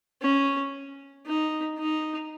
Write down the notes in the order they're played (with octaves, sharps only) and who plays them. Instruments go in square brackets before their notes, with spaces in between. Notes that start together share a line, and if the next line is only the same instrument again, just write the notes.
[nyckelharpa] C#4
D#4
D#4